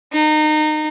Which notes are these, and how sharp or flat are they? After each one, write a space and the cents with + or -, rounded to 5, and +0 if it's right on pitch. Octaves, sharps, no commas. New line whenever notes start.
D#4 -25